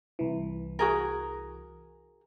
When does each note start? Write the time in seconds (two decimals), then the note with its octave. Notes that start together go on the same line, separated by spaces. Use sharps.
0.19 C2 E3
0.79 F#4 G#4 A#4